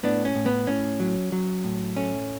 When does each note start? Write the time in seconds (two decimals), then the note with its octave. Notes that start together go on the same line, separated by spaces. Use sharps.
0.03 A2 B3 D4
0.25 C#4
0.35 A2
0.46 B3
0.67 A2 C#4
1.00 F#3
1.32 F#3
1.64 A2
1.96 A3 C#4